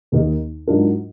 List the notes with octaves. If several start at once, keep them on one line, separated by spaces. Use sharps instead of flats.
D#2 D#3 A#3 D#4 A#4
G#2 F#3 D4 F4 A#4